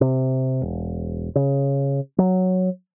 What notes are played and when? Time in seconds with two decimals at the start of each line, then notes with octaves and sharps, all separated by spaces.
0.01 C3
0.62 E1
1.36 C#3
2.18 F#3